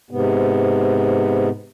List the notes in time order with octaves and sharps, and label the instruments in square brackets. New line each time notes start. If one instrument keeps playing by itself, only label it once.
[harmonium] G#2 C3 B3